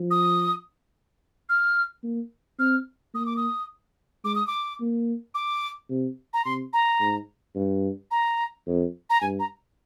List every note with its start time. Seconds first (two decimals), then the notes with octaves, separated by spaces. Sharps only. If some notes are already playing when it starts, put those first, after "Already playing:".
Already playing: F3
0.11 D#6
1.49 F6
2.04 A#3
2.59 C4 F6
3.14 A#3 D#6
3.26 D6
3.37 D#6
4.24 G#3 D6
4.35 D#6
4.47 D6
4.80 A#3
5.35 D6
5.90 C3
6.34 A#5
6.45 C3 C6
6.73 A#5
7.00 G#2
7.55 G2
8.11 A#5
8.67 F2
9.10 A#5
9.21 G2 G#5
9.40 A#5